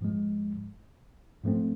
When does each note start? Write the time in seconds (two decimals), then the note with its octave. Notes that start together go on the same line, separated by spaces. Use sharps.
0.01 G#2 F3 G#3
1.43 G#2 F3 A3 C4